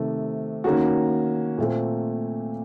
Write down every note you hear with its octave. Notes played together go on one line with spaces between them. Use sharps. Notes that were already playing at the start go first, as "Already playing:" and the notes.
Already playing: C3 D#3 A3
D#3 A#3 C#4 F#4
A#2 A3 C4